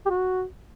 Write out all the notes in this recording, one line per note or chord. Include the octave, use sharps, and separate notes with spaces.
G4
F#4